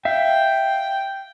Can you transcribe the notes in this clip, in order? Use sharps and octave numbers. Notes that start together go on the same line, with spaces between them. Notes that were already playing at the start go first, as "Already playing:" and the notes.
E5 F5 G5